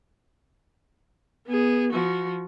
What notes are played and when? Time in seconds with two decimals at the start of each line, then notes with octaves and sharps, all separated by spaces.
1.47 B3 G#4
1.93 F3 F#4